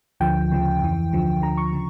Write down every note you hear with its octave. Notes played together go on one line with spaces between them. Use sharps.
D2 D3 F3 G5
D2 C#3 F3
F2 E3
D2 D3 F3
D2 D3 F3 A#5
C#6
C#3 F3